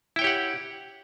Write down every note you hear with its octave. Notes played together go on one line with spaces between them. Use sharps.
E4 G4 C#5 F#5 G5